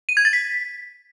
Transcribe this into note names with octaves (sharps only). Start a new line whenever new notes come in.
D#7
G#6
A6
B6